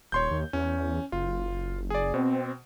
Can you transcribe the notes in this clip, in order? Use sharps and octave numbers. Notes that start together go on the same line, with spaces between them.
D#1 C#5 C6 G6
D#2
E2 C#4
F#1 F4
G#4 D5
B2 C4